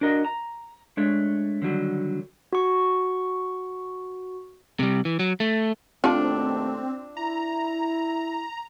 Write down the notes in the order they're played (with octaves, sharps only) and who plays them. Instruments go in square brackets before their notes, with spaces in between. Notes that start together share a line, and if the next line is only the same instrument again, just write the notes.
[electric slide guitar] D4 F#4 A#4 D#5
A#5
G#3 A3 D4 C#5
D3 D#3 F#3 G3
[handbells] F#4 C#6
[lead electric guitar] C3 G3
E3
F#3
A3
[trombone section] D#2 B2 A3 [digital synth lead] C4 [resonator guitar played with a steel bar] D4 [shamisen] F4 A5
[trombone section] E4 [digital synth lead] A#5